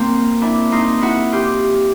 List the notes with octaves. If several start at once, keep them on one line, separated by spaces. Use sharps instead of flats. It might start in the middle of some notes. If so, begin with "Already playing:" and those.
Already playing: A#3 C4
D4 E4
D#4 F4
E4 F#4
F4 G4